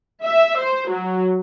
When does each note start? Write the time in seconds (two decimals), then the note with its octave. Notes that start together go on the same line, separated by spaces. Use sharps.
0.24 E5
0.59 C5
0.89 F#3